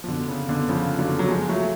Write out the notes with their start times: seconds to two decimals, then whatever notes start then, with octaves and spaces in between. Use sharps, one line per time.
0.04 F3
0.08 B2 D3
0.28 C#3
0.48 B2 D3
0.69 C#3 F3
0.99 D3 F#3
1.19 F#3
1.29 F3 G#3
1.49 F#3 A3